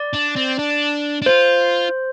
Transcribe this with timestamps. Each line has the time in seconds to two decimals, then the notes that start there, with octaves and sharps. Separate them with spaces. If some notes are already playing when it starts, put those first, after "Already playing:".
Already playing: D5
0.13 D4
0.36 C4
0.59 D4
1.22 D4
1.26 F4 C5